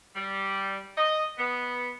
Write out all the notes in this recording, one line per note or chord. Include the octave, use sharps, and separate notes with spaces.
G3
D#5
B3